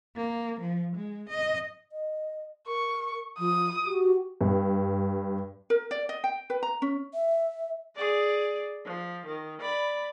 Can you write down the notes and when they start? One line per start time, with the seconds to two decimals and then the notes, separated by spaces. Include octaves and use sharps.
0.16 A#3
0.61 F3
0.96 G#3
1.29 D#5
1.92 D#5
2.67 A#4 C#6
3.39 F3 D#6
3.86 F#4 G4
4.41 G2
5.70 A#4
5.91 D5
6.09 D#5
6.24 G5
6.50 B4
6.63 A#5
6.82 C#4
7.14 E5
7.96 G#4 D5
8.85 F3
9.26 D#3
9.61 D5 B5